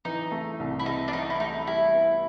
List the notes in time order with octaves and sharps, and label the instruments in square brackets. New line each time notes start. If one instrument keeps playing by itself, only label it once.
[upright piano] E3 [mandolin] D#4
[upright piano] A3
C2
[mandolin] E4
[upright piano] C3 [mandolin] D#4
[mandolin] D4
[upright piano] E3 [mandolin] D#4
[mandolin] E4
[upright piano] A3 [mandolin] D#4
[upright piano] G3 [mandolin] E4
[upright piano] B3